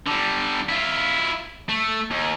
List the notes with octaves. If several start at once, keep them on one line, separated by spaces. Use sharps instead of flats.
D3 G3
E4 F4
A3
D#2